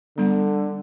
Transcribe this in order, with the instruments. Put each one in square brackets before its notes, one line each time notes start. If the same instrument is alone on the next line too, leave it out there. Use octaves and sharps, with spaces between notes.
[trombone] D3 [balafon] G3 B3